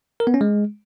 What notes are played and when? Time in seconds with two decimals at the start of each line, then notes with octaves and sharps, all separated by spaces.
0.20 A#4
0.27 B3
0.34 C#4
0.41 G#3